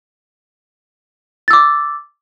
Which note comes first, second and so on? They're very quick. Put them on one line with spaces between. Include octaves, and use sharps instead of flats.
A6 E6 D6